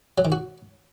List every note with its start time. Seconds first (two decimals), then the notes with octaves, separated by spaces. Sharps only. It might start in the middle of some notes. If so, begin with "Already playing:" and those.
0.18 F#3
0.25 D#3
0.32 F#4